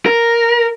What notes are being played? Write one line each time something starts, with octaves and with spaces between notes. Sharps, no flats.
A#4